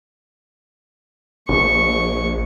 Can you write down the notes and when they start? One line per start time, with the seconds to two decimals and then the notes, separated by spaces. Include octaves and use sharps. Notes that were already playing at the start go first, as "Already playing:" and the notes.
1.49 A#1 C#6